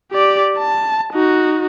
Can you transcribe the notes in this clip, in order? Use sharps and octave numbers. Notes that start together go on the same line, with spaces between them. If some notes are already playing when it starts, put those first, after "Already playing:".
G4 D5
A5
D#4 F#4